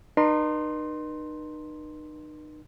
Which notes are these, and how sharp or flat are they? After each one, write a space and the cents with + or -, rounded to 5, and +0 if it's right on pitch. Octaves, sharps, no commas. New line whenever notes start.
D#4 -35 B4 -45 C6 +5